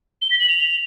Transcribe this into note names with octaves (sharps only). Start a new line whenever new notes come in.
G7
B6
F#7
F7